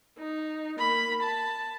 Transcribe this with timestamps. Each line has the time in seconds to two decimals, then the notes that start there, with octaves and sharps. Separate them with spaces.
0.19 D#4
0.78 A#3 B5
1.23 A5